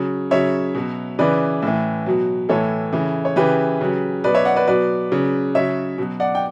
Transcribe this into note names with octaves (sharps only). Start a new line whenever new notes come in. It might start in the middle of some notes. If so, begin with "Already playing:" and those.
Already playing: C#3 F#3
C#3 F#3 C#5 E5
B2 F#3
C#3 E3 B4 D5
A2 E3
B2 F#3
A2 E3 A4 C#5
C#3 E3
C#5
C#3 E3 G4 B4
C#3 F#3
B2 F#3 B4 D5
C#5 E5
D5 F#5
B4 D5
B2 F#3 B4 D5
C#3 F#3
C#3 F#3 C#5 E5
B2 F#3
D5 F#5
G5